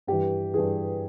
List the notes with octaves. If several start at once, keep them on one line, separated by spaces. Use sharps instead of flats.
G2 E3 G4
G2 E3 G#4